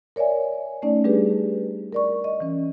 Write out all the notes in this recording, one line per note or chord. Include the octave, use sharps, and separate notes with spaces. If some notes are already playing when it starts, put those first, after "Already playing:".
A#4 C#5 D5 E5 G#5
A3 C#4 D#4 D5
G3 D4 G4 G#4 B4
A#4 D5 C#6
D#5
E3 C#4